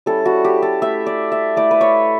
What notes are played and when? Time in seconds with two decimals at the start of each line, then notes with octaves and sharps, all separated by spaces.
0.06 G3 C#4 E4 A4
0.26 F#4
0.45 G4
0.62 A4
0.82 A3 E4 E5
1.06 D5
1.32 E5
1.56 A3 E4 D5
1.71 B4
1.81 C#5